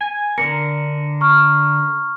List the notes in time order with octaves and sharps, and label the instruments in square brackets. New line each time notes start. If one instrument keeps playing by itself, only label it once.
[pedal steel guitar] G#5
[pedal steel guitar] D3 D4 A#4 [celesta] C#7
[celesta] A#5 C#6 F6